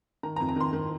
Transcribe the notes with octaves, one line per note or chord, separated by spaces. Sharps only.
D#3 A#5
A#5
F2
A#5
D#3 C6
D#3